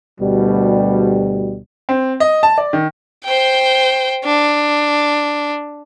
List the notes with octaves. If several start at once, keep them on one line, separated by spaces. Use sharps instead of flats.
D2 B2 G3
C4
D#5
A5
D5
D#3
C5 G5
D4